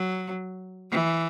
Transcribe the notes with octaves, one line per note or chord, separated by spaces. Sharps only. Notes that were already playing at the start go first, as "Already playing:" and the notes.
Already playing: F#3
E3